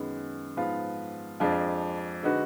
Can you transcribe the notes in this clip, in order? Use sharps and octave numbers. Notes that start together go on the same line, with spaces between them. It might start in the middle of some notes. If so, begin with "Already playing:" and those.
Already playing: F#2 D#3 G#3 B3
G#2 F3 B3 F4
F2 F3 G#3 D4 F4
D3 G#3 D#4 F#4 B4